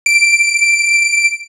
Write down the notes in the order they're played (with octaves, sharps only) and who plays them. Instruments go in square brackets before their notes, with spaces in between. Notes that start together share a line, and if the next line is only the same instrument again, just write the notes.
[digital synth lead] D7